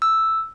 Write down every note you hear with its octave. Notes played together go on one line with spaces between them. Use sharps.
E6